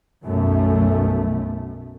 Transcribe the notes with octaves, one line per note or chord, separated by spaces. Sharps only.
B1 F#2 A3